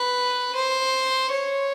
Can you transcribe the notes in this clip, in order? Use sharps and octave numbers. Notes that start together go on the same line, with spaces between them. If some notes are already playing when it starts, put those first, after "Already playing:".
Already playing: B4
C5
C#5